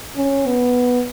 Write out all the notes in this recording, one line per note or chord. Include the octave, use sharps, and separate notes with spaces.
C#4
B3